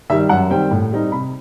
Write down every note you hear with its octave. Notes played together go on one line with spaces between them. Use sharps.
D#3 G3 D#4 E5
F#2 F#5
D#3 G3 C4 G5
A2
G3 C4 D#4
C3 B5